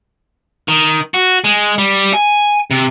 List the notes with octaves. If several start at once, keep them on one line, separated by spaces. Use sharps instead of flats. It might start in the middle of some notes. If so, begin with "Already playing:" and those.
D#3
F#4
G#3
G3
G#5
C3